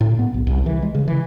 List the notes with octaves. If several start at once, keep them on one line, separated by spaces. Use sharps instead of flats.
A2
B3
B1
C2
E3
G#3
C#3
E3